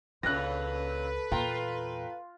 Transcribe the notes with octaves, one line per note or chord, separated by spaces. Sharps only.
C#2 A#2 C#3 D4 A4 B4 F#6 A#6
E2 A#2 F4 G5 A#5